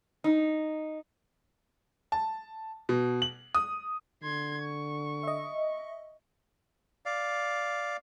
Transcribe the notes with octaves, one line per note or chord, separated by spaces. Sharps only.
D#4
A5
B2
F#7
D#6
D3 C6 G#6
C#6
D#5 E5
D5 F5